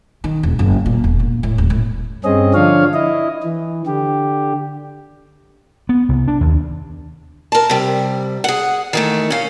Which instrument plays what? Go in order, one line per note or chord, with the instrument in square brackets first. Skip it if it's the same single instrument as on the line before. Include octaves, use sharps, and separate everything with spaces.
[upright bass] D#3
E1
F#1
A#2
E1
A#2
A2
D#1
A2
[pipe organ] G2 C4 C#4 G#4 D#5
D3 F3 D4 C#5 F5
E4 D#5
E3
D3 G4
[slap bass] B3
C2
D4
D#2
[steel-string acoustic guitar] A#4 A5
C3 G3
G#4 F#5
D#3 E3 A3
C#4 F5